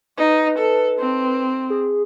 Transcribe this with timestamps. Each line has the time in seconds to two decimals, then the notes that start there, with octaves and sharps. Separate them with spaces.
0.18 D#4 B4
0.59 A4
0.99 C4
1.70 G#4